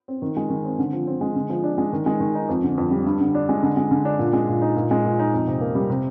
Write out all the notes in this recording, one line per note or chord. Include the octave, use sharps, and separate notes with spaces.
C4
D#3
G#3
D#3
C4
D3
F3
C4
G#3
D3
F3
D4
G#3
D#3
G#3
D#3
D#4
F2
D3
F2
G3
G2
D3
D4
G#3
D3
G#3
D3
D4
A#2
G#3
A#2
D#4
A#2
G#3
A#2
D#4
F2
C3
A#3
G3
C3